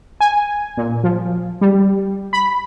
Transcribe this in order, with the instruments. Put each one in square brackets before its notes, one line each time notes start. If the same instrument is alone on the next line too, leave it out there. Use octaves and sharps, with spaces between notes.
[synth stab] G#5
A#2
F3
G3
B5